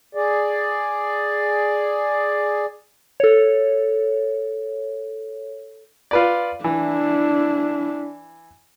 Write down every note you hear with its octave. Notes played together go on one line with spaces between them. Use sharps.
G#4 D5
A4 C#5
F4 B4 D5
E3 D4 E4